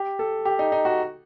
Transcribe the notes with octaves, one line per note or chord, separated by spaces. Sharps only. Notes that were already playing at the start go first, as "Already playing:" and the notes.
Already playing: G4
A4
G4
D#4
D#4
F#4